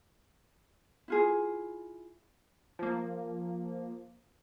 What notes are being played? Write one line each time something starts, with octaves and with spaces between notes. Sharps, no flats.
E4 F4 G#4
F3 A#3